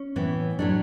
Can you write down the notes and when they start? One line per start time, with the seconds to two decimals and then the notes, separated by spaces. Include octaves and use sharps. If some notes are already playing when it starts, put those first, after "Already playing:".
Already playing: C#4
0.16 A2 E3 B3
0.59 A2 F#3 A3 D4